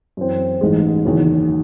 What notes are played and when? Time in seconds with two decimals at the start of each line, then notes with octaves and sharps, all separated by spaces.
0.17 F#2 E3 C4
0.61 A1 G#2 E3 G#3
1.05 F#1 E2 D#3 F#3